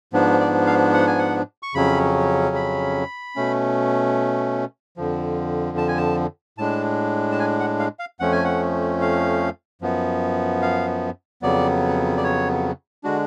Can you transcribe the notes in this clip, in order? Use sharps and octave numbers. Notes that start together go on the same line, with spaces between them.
G#2 F3 B3 D4
D5
F5
F#5
G#5
F#5
C#6
F2 C#3 F#3 C#4 B5
B5
B2 A3 C#4
F2 D3 F3
A5
G#5
A5
A2 G#3 D4 A5
A5
G#5
F#5
F5
F5
F2 F3 A3 C#4 F#5
G#5
F#5
F5
F#2 F3 B3
F5
F2 C#3 F#3 B3 D5
D5
C#5
D3 G#3 D4 F#4